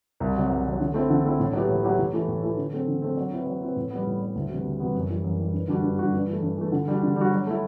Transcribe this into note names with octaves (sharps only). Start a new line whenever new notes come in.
C2
C3 F#3
C2
C3 F#3
D3
A3 C4 E4
D3
A3 C4 E4
A2
F#3 B3 E4 G4
A2
F#3 B3 E4 G4
A2
E3 A3 E4
A2
E3 A3 E4
D3
F#3 A3 C4
D3
F#3 A3 C4
F#3
C4 E4 B4
F#3
C4 E4 B4
A2
G3 B3
A2
G3 B3
D2
C3 G3 B3 F#4
D2
C3 G3 B3 F#4
F#2
E3 G3
F#2
E3 G3
G2
D3 G3 D4 F#4
G2
D3 G3 D4 F#4
G2
E3
A3
G2
E3 A3
D3
G3 D4 F#4
D3
G3 D4 F#4
F#3
A3 E4